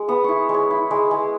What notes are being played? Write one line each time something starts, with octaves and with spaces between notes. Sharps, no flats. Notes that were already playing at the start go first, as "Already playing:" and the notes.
Already playing: G#3
B3 D#6
E4 C#6
G#3
C#5
E4
G#3
G#3